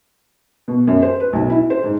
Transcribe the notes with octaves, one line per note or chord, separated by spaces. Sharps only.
B2
F#2
C5
B4
B1
E4
C5
G#2